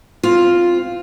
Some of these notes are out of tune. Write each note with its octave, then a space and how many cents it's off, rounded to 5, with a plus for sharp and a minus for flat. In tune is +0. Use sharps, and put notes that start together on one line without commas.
C4 +0 F4 +0